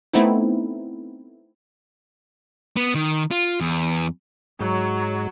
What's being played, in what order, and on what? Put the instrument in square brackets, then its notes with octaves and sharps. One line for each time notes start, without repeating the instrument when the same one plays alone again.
[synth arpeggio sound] A3 B3 C4 D#4 E4
[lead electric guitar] B3
D#3
F4
E2
[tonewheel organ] G#2 G#3 [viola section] F#3